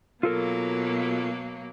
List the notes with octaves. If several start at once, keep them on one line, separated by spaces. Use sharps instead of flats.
B2 F#3 A#3 F4 A4 A#4